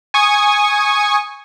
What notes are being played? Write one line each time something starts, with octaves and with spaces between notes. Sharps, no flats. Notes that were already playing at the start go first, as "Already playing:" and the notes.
G#5 C#6 D#6 G#6